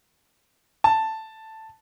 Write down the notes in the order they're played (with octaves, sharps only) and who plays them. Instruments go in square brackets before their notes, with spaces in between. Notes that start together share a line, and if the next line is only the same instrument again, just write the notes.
[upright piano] A5